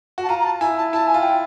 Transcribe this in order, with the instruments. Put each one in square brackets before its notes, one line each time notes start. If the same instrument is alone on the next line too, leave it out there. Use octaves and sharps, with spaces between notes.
[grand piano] F#4
[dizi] A5
[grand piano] F4 [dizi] A#5
[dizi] A#5
A5
[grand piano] E4 [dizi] G#5
[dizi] A5
[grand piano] E4 [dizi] A5
[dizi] G#5
[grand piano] F4
[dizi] G5